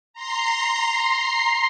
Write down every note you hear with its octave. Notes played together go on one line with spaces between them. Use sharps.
A#5 C6 C7